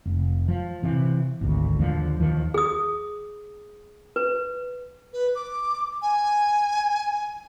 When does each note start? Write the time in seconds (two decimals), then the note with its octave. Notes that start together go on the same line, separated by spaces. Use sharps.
0.06 F1
0.48 F3
0.83 C3 E3
1.41 G#1 D2
1.79 D#2 D3 F3
2.20 D#2 D#3 F3
2.54 G#4 D#6
4.16 B4
5.13 B4
5.35 D6
6.02 G#5